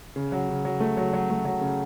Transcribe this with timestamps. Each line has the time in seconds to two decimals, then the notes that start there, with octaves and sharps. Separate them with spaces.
0.16 C#3
0.32 F#3
0.49 C#3
0.65 F#3
0.80 A3
0.97 F#3
1.14 F#3
1.30 A3
1.45 F#3
1.61 C#3